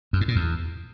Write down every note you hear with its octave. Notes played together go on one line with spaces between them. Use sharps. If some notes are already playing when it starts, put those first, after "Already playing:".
F#2
G#2
A#2
E2